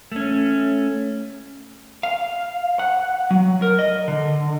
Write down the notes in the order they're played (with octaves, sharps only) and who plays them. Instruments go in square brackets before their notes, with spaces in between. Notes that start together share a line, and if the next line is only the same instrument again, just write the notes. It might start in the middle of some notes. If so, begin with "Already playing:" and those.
[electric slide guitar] A3 C#4
[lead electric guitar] F5
F#5
F#3
A#4
D#5
D3